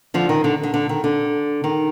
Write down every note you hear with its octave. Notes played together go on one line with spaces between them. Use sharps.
D3 F3
D#3
D3
D3
D3
D#3
D3
D#3